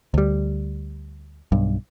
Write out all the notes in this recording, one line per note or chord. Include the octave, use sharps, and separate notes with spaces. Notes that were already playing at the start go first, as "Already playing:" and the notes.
D2 G3
B1 G2